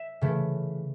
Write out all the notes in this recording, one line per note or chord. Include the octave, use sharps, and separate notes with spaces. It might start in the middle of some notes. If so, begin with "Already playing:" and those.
Already playing: E5
C#3 E3 A3